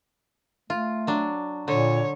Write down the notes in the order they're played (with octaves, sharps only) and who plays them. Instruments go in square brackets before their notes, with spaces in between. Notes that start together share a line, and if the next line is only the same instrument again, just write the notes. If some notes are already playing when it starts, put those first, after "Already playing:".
[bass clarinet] A3 [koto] F4
[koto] F#3 D4
[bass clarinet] A#2 [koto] D3 [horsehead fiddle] C#5